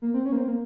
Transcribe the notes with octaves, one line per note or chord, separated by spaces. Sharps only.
A#3
C4
C#4
A#3
C4
A#3